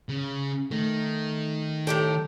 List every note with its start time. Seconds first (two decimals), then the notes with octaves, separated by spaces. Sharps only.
0.09 C#3
0.71 D#3 A3
1.87 A2 G4 A4 G5